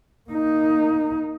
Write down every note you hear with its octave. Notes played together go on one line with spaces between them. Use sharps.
A#3 D#4